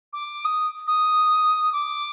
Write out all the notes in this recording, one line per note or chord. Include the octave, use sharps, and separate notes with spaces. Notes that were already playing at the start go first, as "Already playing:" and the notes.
D6
D#6
D#6
D6